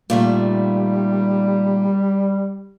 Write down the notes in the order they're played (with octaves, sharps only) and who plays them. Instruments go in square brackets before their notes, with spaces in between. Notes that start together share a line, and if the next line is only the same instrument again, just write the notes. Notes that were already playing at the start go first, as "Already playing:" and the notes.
[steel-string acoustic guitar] A#2 D#3 A3 [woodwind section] G3